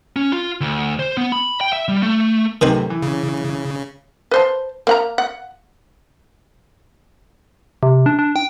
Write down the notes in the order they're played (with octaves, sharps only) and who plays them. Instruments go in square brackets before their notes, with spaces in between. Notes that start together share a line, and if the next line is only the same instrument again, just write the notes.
[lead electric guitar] C#4
F4
D2
C5
B3
B5
G5
E5
G3
A3
[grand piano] F#2 A2 C3 [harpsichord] D#3 C4 B4
[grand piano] E3
[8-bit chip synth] C#3
[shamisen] B4 C5 A5
A#3 F#5 A#5
F#5
[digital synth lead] C3
D4
D4
G5